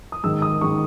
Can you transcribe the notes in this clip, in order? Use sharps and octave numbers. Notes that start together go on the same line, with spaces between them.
D#6
G#2 D#3 E6
D#6
G#2 D#3 C#6